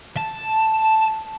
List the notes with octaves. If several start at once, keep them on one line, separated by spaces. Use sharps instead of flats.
A5